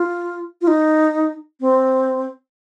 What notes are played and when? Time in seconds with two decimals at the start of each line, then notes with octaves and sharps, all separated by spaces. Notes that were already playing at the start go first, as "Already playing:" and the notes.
Already playing: F4
0.62 F4
0.67 D#4
1.61 C4